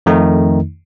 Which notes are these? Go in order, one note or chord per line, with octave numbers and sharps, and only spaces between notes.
F2 D#3 A3 D#4